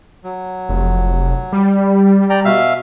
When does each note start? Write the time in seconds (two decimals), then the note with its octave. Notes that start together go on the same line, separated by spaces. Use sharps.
0.24 F#3
0.69 F1
1.52 G3
2.30 D5 G5 A#5
2.45 B2 E5 F5